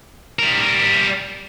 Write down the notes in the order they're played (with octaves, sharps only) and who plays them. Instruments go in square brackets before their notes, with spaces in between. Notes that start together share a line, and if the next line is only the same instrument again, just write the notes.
[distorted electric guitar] G3 A#4